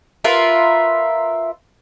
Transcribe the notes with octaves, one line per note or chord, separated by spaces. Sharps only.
F4 A#4 B4 E5